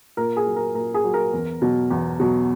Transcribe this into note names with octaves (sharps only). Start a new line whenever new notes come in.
A#2 A#4
G#4
F#3
A#4
A#2 A#4
G#4
F#3
A#4
E2
B2 F#3
E2
B2 F#3